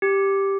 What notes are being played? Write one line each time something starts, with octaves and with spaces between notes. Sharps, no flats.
G4